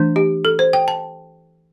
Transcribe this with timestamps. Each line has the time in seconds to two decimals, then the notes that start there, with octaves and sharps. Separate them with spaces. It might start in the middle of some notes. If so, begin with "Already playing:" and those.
Already playing: E3 A3 D4
0.16 G4
0.45 A4
0.59 C5
0.73 G5
0.88 A5